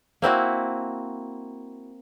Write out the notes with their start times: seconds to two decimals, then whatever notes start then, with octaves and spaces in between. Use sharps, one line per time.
0.22 A#3 C4 E4 F#4